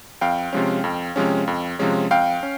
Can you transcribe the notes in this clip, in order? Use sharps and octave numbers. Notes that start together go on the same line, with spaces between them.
F2 F5 G5
C3 F3 G#3 C#4
F2
C3 F3 G#3 C#4
F2
C3 F3 G#3 C#4
F2 F5 G5
C#4